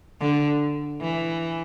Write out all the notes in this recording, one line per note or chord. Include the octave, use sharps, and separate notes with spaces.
D3
E3